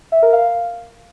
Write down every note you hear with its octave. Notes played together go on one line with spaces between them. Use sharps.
E5
A#4
F5